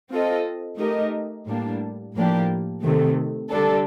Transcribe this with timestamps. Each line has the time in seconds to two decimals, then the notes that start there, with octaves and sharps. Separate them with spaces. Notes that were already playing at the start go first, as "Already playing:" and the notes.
0.11 C4 F4 A4 D#5
0.78 A3 D#4 G4 A#4 D#5
1.47 A2 G3 A#3 D4
2.15 A2 F3 A#3 D4 G4
2.83 C3 D#3 A3
3.50 D3 G3 D4 A4